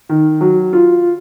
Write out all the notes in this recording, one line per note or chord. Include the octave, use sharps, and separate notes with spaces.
D#3
F#3
F4